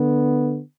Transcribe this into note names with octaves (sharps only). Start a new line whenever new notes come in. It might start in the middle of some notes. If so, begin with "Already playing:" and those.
Already playing: D3 B3